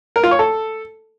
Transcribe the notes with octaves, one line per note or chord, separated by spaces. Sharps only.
A#4
F4
C#5
A4